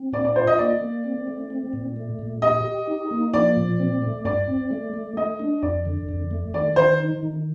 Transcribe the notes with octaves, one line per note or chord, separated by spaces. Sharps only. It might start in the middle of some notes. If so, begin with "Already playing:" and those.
Already playing: C4
A#2 D5
D5
F4 C5
D#5
A#3 D5
A#3
C4
A3
C4
A#2
A3
A#2
G4 D#5
G4
D#4
A#3
F3 D5
A#2
C4
A3
G2 D5
C4
A3
A3
A3 D#5
D4
F2 D5
D3
F2
A3
D#3 D5
D#3 C5
D#4
D#3